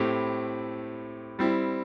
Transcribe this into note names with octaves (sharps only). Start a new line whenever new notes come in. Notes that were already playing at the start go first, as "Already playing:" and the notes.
Already playing: A2 A3 C4 E4 G4
G3 C4 E4